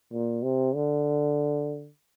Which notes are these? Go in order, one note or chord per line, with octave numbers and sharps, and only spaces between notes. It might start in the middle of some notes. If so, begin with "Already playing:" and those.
A#2
C3
D3